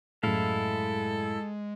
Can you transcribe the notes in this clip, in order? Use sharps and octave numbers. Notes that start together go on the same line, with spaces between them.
F#2 A2 G#3 E4 A4 F5